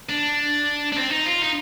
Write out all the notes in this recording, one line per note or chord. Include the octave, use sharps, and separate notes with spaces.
D4
D4
C4
D#4
F4
D#4